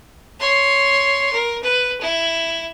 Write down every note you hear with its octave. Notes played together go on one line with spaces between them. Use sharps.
C#5 C6
A#4
B4
E4